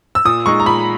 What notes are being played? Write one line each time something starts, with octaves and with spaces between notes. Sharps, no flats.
E6
A#2 D#6
G#3 D#4 C#6
A#5
A#2 B5